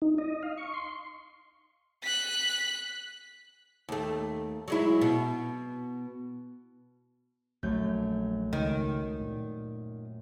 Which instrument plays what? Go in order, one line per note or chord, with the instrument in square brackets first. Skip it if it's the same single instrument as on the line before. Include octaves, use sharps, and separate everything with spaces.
[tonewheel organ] D#4
D#5
F5
C#6
C6
[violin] F#6 B6
[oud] D#2 A3
F#3 G#3 E4
B2
[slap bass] A#1 F#3 [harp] F#2 A3 G6
[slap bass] C#2 [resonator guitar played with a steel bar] D#3
[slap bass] A#2